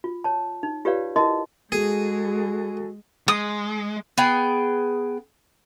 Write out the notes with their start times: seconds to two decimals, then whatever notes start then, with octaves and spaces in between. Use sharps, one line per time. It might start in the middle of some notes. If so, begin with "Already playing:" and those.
0.04 F4
0.24 C#5 A5
0.63 D#4
0.85 F4 G4 B4 C#5 D5 F5
1.16 E4 A#4 D#5 A5 C6
1.72 G#3 F#4 G#4 A4 G#5
3.28 G#3 D#6
4.18 B3 G#4 G5